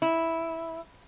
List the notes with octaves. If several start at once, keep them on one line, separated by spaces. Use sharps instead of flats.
E4